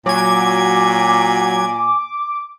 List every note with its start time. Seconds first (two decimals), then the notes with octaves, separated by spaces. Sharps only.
0.06 A#2 F#3 G#5 D6 G#6